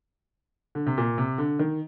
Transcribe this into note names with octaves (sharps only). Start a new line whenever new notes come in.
D3
C3
A#2
C3
D3
D#3